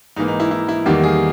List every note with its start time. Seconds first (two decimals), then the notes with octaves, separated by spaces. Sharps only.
0.16 G#2 E3 A#3 D#4
0.28 D#4
0.40 E4
0.51 E4
0.69 E4
0.86 E2 D#3 G3 A#3 G4
1.03 G#4